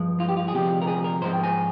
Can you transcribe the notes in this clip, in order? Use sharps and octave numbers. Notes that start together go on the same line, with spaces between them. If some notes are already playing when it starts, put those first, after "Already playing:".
Already playing: G2 F3 G#3
F4
G4
F4
G#4
D2 C3 F3 G#3 G4
A#4
G#4
A#4
G#2 F3 G#3 C5
G5
G#5